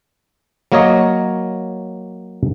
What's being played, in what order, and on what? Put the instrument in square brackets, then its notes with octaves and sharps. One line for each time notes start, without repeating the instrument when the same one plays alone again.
[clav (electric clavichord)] F#3 A#3 A#4 C#5 D#5